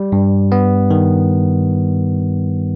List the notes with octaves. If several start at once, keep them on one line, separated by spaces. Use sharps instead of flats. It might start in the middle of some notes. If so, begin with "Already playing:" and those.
Already playing: G3
G2
B3
D#3